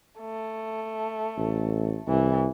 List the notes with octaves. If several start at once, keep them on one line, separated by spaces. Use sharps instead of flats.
A3
A1
C2 E3